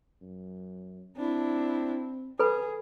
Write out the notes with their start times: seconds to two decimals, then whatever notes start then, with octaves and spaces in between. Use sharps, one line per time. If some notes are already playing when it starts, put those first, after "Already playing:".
0.21 F#2
1.16 C4 D4 E4
2.39 G#4 A4 B4 B5